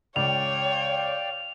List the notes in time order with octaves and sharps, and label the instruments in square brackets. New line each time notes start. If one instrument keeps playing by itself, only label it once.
[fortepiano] C#2 [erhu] C#5 [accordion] D5 F5 G5 [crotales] F7